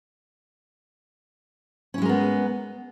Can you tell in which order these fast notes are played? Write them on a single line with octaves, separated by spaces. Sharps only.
C#4 E4 G#3 A#4 B3